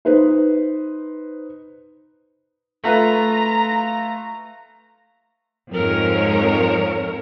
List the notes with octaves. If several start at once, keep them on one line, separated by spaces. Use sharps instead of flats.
D#4 B4 C5
A3 F4 B4 A#5
F2 G#2 F3 G#3 A#4 C#5